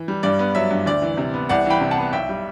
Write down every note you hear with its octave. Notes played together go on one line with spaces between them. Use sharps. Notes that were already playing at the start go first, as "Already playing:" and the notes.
Already playing: E3
G3
G2 D5
B3
F#3 E5
G2
D2 D5
E3
C3
B3
C2 D5 F#5
E3 G5 B5
C3
F#5 A5
B3
B1 E5 G5
G3